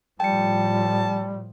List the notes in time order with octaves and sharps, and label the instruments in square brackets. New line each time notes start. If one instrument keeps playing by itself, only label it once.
[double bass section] A2 F3 [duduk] G3 [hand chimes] G5 C#7 [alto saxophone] A5